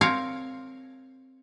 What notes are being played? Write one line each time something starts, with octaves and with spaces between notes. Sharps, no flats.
C4 A#4 C#5 F5 A#5